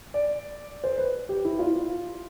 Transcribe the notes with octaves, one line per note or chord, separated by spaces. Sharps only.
D5
C5
B4
G4
E4
F4